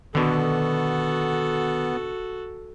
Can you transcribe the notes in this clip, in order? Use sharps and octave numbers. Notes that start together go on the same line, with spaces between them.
B2 D3 D#3 B3 F#4 A4